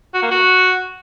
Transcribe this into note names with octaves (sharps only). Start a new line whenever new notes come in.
F#4
A#3
F#4